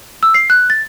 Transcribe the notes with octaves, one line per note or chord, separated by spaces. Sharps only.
E6
C7
F#6
A6